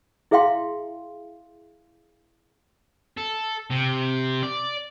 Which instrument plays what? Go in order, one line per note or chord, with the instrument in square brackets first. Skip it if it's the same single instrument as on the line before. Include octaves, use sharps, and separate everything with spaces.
[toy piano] E4 G#4 E5 F5 G5 C6
[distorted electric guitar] A4
C3
D5